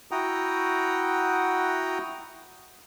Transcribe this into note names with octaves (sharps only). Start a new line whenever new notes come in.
E4 F#4 F#5 G5 A#5 D#6